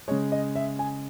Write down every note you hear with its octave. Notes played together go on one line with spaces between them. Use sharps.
C#3 G#3 C#5
D#5
E5
G#5